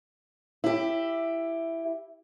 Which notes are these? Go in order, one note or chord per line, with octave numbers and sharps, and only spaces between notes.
E4 G4